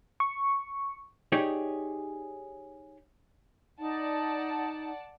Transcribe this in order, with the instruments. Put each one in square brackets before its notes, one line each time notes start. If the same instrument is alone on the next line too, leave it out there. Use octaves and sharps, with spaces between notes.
[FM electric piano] C#6
[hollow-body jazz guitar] D#4 G4 G#4 C#5 D5
[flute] D#4 [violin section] D5 F#5 A5